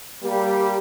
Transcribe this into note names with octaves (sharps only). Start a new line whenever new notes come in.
G3 A#3 G4